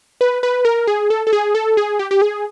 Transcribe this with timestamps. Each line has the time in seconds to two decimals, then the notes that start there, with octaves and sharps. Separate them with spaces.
0.21 B4
0.43 B4
0.65 A#4
0.87 G#4
1.10 A4
1.27 A4
1.33 G#4
1.55 A4
1.77 G#4
1.99 G4
2.11 G4
2.22 G#4